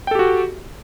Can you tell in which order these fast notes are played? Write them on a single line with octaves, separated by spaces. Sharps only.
G5 A4 G4 F#4